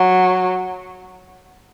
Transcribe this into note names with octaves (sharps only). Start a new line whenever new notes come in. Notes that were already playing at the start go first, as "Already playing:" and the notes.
Already playing: F#3